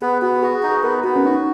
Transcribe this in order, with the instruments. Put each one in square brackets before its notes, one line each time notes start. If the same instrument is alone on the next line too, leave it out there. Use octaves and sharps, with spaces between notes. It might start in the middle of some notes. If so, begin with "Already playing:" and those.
[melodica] B3 [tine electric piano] G#4
[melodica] B3 [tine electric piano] F#4
[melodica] F#4 [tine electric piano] G#4
[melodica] D#4
[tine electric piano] G#4
[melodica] B3 [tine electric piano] A#4
[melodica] B3 [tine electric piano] F#4
[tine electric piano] C#4
[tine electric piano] D#4 [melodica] F#4